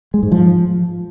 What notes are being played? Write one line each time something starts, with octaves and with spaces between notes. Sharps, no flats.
G#3
G#2
F3